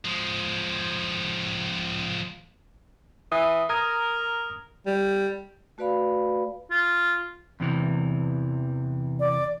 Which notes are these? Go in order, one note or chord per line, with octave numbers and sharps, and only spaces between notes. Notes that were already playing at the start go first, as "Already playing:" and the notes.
F3 G#3
E3 D#6
A#4 A#5 D#6 G#6
G3
A3 F#4 B4 D5 F5 B5
F4
E2 C3 E3
D5